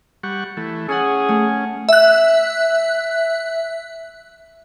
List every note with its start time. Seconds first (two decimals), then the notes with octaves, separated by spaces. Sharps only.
0.23 G3 F#5 C#6
0.57 E3 A3
0.89 C#4 G#4 F#5 G#5 C#6
1.29 A3
1.89 E5 F#6